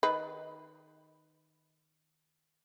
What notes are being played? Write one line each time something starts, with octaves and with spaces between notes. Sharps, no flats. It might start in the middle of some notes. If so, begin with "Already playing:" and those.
D#3 B4